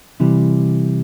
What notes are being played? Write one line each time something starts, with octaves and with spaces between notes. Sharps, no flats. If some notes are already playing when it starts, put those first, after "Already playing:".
C3 E3 G3